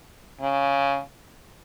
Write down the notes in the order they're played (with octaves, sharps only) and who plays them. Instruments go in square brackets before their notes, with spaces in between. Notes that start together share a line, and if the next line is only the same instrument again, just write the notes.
[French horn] C#3